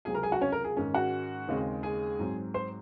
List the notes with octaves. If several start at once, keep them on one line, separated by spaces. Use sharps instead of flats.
C#2 C3 F#3 C4 G#4 G#5
A#4 A#5
G#4 G#5
F#4 F#5
C#4 C#5
A#4
G#4
G#2 D#3 G#3 C#4
F#4 F#5
D#2 C#3 G#3 C4
G#4 G#5
G#2 F#3 C4
C5 C6